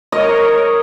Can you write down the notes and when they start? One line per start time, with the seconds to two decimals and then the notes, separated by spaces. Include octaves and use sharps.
0.12 A#4 C#5 D#5